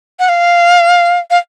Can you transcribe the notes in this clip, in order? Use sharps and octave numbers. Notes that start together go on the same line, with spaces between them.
F#5
F5
F5